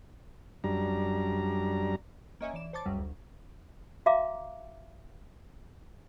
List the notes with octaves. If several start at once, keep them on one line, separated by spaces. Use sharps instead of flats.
F#2 G3 D4 A#5
A#3 C#4 C#5 D#5 E5 G#5
E3 D5 E7
C5 C#5 A5 C6 D6 A6
C#2 F#2 F#3 G3
D2
F#4 E5 F5 A#5 D6